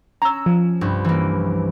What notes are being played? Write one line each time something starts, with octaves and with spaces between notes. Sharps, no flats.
C#4 A#5 E6
F3
C2 G2
E3 A#3